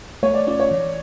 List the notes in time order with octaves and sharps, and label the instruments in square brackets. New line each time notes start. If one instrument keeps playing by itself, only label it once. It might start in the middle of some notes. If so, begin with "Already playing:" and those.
[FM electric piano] A3 [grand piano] C#5
[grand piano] D5
[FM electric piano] C#4 F4 [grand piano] D5
[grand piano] C#5
[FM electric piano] E3